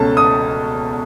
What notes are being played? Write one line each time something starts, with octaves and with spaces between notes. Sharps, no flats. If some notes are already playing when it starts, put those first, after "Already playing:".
Already playing: C#2 B2 A3 C#4 A5
D#6